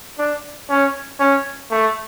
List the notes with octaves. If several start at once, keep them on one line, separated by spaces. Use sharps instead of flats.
D4
C#4
C#4
A3